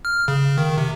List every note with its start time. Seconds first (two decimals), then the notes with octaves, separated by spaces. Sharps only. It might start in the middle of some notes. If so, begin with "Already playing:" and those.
0.05 F6
0.28 C#3
0.58 D#3
0.77 C3